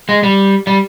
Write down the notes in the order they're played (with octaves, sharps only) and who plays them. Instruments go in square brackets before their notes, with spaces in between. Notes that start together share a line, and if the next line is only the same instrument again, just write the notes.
[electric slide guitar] G#3
G3
G3